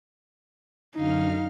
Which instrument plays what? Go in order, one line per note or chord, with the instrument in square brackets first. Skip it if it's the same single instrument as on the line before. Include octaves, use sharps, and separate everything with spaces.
[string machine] F#2 D3 F6 [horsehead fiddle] D#4 F5